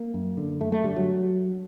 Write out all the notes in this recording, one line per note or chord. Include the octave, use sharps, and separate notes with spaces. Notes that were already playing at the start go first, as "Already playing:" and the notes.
Already playing: A#3
F#2
D3
F#2 A3
A3
D3 G3
F#3